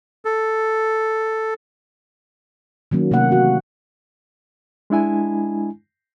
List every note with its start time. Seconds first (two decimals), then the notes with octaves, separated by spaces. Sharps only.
0.25 A4
2.91 D#3 F#3 A#3 C#4
3.11 C3 F#3 A3 A#3 F#5
3.32 E3 F#4
4.90 G#3 D4 E4 G#5